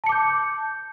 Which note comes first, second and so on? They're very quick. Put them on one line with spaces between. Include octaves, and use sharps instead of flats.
A5 C#7 D6 G6